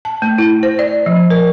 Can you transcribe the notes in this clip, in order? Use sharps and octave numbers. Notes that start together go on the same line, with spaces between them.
A5
A3
E4
C5
D5
F3
A#4